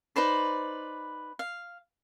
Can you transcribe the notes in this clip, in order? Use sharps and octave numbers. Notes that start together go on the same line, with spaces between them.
D#4 B4 C5 D5
F5